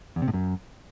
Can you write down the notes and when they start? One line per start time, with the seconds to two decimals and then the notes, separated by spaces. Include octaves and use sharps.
0.16 E2
0.22 C3
0.28 A2
0.33 F#2